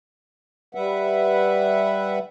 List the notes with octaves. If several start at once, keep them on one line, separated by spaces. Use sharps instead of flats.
G3 B4 E5 F#5